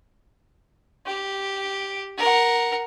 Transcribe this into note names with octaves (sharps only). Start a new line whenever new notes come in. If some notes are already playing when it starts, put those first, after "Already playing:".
G4
A#4 F#5